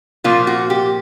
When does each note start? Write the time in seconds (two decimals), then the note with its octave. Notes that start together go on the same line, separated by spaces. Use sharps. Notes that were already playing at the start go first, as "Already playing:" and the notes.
0.24 A#2 F3 A#3 F4
0.47 F#4
0.70 G4